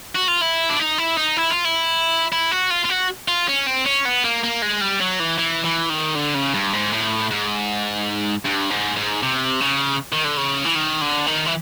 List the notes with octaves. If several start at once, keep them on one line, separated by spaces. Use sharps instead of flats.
F#4
F4
E4
D4
D#4
E4
D#4
E4
F4
E4
E4
F#4
F4
F4
F#4
F4
C#4
C4
C#4
B3
A#3
A#3
G#3
G3
F#3
E3
E3
E3
D#3
D3
C#3
G2
G#2
A2
G#2
G2
G#2
G#2
C3
C#3
D#3
D3
C#3
E3
D#3
D3
D#3
E3